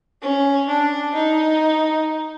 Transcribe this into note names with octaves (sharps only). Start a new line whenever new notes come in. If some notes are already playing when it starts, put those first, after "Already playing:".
C#4
D4
D#4